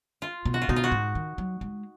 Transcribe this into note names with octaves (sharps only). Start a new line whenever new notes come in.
F4
B2
F#4
F4
B2 D#4
F4
F#4
G#2
D#3
F#3
G#3